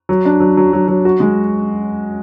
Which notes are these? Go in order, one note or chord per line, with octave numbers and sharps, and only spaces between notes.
F#3
D4
F#3
F#3
F#3
F#3
F#4
G#3